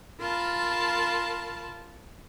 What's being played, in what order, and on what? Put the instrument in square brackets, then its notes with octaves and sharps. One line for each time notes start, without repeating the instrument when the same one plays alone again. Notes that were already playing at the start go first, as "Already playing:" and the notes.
[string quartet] F4 A#4 A5 B5